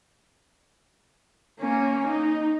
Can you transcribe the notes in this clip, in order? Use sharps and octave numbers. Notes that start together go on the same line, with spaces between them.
A#3 C#4
D#4